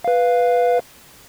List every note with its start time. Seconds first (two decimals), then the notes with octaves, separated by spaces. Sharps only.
0.04 B4 F5